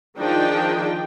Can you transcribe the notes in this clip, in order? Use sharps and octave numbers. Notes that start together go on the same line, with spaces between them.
D#3 F3 D4 D#4 G#4 G5